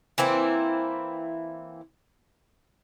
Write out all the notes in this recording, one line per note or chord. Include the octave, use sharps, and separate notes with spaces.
E3 A#3 C4 E4